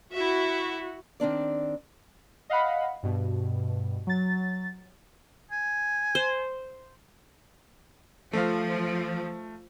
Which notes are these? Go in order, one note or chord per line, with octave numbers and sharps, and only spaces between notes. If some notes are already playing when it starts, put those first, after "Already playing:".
E4 F#4 E5
D#3 C4 D4 D5
D#5 F5 F#5 B5
G2 B2
F#3 A6
G#5
C5
F3 A3 F5